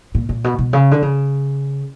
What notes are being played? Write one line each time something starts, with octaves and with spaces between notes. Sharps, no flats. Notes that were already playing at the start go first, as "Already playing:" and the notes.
A#2
A#2
B2
B2
C#3
D3
C#3